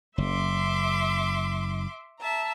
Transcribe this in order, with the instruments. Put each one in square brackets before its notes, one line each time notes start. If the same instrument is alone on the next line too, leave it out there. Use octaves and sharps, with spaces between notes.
[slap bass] F#1 [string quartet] E5 C6 D6
[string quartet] E5 A5 A#5